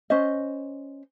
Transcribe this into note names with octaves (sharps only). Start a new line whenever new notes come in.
C#4 C5 D#5